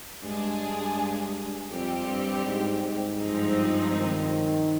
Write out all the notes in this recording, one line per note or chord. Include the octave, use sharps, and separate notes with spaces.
G2 G#3 D4 G#4
F2 G3 C4 G4
G2
G#2
G#2
G2 F3 G#3 C4 D#4
D#3